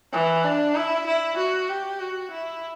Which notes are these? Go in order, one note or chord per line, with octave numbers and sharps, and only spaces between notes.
E3
D4
E4
E4
F#4
G4
F#4
E4